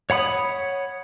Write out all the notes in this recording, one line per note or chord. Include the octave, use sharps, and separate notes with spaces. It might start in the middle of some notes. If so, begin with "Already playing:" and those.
C#5 F#5 B5 D#6